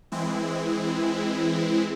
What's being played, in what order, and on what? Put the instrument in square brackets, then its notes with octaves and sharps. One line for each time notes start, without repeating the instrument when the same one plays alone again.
[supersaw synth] E3 G#3 C4 E4